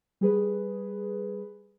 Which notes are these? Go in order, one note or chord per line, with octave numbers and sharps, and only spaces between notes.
G3 G#4 B4